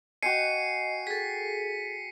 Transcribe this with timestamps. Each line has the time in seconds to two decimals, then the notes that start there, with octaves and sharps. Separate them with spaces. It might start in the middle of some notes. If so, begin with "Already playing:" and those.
0.22 F#4 D#5 G5 G#5 C7 C#7 D#7
1.07 G#4 A4 B6